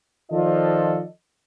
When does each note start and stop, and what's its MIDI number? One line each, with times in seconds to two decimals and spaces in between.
0.31 1.04 51
0.31 1.04 53
0.31 1.04 65
0.31 1.04 69
0.31 1.04 74
0.31 1.04 75